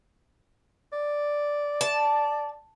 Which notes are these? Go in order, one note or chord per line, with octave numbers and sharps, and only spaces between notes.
D5
A5